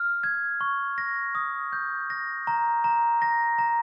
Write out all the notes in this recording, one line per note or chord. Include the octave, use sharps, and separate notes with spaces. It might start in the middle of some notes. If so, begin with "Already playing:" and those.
Already playing: F6
G#6
C#6
A#6
D#6
G6
A#6
A#5
A#5
A#6
A#5